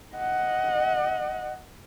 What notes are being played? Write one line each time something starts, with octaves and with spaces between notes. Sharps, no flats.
D#5 F#5